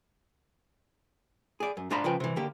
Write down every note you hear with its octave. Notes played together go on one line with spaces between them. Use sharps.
G#4 D5
F#2
G#2 D4 F4 D5 A#5 B5
C#3 F3 B4 G5
C3 E3
D3 A#3 G4